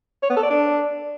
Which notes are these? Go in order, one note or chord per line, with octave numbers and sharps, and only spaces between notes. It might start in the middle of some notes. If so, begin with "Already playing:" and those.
C#5
B3
A4
D5
D4